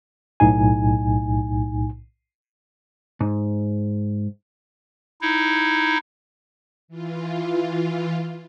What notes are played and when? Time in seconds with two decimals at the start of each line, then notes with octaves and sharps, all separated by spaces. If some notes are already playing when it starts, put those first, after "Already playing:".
0.40 B1 A2 D#4 G#5
3.20 G#2
5.21 D#4 E4
6.88 E3 F4